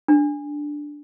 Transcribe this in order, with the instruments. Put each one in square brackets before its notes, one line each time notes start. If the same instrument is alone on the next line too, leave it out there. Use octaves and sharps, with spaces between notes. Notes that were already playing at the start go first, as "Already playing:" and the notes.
[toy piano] D4